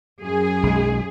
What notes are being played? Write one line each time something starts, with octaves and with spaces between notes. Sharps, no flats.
F#2 G#4
B1 G#3